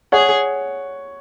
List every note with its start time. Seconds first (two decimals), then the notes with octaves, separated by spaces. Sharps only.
0.12 G#4 C#5 F#5